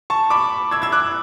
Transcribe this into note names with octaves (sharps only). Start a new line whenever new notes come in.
A5 C#6
B5 D6
E6 G#6
E6 G#6
D6 F#6